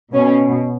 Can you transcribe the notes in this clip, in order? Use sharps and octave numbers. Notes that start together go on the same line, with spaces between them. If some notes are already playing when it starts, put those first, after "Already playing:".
B2 C#4